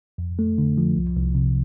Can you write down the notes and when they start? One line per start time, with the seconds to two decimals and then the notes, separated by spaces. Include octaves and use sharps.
0.18 F2
0.39 A3
0.58 D3
0.78 F3
0.96 C2
1.16 C2
1.35 C3